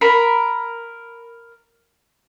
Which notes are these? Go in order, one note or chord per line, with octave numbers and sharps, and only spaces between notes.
A#4 B5